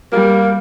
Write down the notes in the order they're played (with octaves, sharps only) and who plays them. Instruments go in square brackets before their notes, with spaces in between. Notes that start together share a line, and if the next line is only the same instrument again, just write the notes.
[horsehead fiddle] G3 [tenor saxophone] A#3